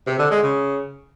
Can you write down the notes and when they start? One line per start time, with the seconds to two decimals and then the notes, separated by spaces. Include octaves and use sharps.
0.07 C3
0.19 D3
0.31 G#3
0.43 C#3